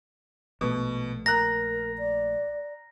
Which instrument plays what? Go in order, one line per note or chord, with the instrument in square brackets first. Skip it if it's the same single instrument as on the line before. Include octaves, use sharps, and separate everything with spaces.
[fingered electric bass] A#1 A3 [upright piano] B2
[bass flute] A#4 [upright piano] A#5 F#6 [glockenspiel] A#6
[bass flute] D5